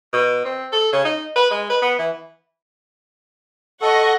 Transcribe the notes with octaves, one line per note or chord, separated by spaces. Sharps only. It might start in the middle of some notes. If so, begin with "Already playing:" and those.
B2
C4
A4
C#3
D#4
B4
G#3
B4
B3
E3
A4 D#5 F#5 C#6